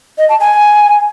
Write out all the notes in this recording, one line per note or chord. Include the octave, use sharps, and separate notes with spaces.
D#5
A5
G#5